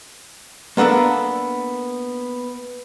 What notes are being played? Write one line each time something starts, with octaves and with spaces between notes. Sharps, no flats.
A#3 B3 D4 A4 A#4